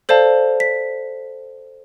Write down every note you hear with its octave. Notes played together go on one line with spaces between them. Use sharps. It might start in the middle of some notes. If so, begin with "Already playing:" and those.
A4 C5 D5 F5 A5
B6